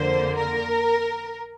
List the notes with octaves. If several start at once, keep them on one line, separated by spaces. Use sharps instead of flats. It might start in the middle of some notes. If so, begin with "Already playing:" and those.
Already playing: F2 D3 A#3 C5
A#4